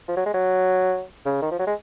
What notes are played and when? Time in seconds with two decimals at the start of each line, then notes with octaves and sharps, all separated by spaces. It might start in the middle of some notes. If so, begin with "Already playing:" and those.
0.08 F3
0.16 F#3
0.26 G#3
0.34 F#3
1.25 C#3
1.42 D#3
1.51 F3
1.59 F#3
1.67 G#3